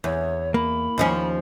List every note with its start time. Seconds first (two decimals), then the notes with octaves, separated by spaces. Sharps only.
0.04 E2 C#5
0.54 A#3 B5
0.98 D#2 F3 C#4